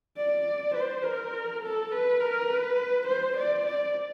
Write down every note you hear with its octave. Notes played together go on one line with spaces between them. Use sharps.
D5
C5
A#4
A4
B4
A#4
B4
C5
D5
D5